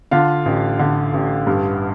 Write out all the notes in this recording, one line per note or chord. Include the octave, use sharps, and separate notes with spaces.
D3 F4 F5
A1
D3
A1
G2